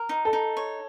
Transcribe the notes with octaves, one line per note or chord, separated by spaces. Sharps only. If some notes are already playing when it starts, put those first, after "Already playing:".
Already playing: A#4
D#4
A4
D#4
C#5